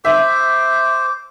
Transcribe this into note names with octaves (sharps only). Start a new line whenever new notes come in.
C5 E5 D6